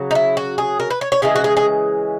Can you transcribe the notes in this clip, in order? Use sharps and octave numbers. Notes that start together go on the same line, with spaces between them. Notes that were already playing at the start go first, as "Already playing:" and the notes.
Already playing: C#3 F#3
D#4
E4
F#4
G#4
A#4
B4
C#5
C#5
C#3 E3 G#3 G#4
F#4
G#4
G#4